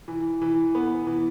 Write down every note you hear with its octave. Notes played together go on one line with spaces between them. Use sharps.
E3
E3
B3
E3